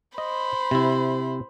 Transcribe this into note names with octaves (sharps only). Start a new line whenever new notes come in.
C5 D#5 B5
C3 E4